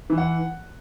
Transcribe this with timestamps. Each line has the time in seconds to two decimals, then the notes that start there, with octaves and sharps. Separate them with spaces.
0.10 E3
0.18 F#5